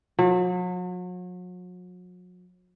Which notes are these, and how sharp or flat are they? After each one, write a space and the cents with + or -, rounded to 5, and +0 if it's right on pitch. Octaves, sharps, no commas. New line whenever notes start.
F#3 -40